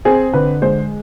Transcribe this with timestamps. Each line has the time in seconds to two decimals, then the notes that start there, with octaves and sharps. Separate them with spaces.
0.05 C4 G#4
0.33 D3 B4
0.62 G#3 C5